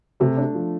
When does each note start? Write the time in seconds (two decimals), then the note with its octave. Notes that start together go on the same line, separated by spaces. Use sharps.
0.20 C3 A3
0.37 D4
0.54 F3